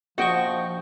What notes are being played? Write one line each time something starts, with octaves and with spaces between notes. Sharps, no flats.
A#1 F3 F#4 D#5 G5 C#6